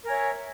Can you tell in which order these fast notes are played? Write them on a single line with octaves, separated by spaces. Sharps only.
A#4 G#5 C#5 E5